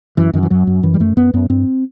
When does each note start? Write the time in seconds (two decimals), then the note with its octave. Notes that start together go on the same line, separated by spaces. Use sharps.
0.17 F#2 E3
0.33 F#2 D#3
0.43 E3
0.50 F#2 F#3
0.67 F#2
0.83 F#2 E3
0.94 G3
1.00 F#2 A3
1.17 F#2 B3
1.34 F#2 B3
1.50 G2 C4